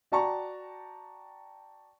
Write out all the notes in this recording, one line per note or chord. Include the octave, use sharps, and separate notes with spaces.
F#4 D5 G5 A5 A#5 C#6